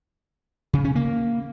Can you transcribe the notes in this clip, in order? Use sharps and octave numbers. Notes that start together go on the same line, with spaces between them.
C#3
C#4
A#3